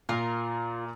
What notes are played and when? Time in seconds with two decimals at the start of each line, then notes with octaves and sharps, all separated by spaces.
0.09 A#2 F4 A#4